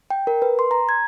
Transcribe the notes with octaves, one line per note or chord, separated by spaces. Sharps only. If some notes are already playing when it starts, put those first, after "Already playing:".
G5
A#4
B4
C6
A#5
G#6